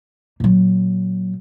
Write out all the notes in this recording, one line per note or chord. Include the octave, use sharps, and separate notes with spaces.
A#2 F#3